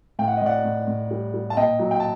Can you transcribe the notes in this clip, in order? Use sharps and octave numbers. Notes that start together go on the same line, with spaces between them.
A2 G5
F#5
D#5
A2 D5 F#5
A2
A2
G3
G3
A5
A#2 D#5 G5
F#3
G5
A5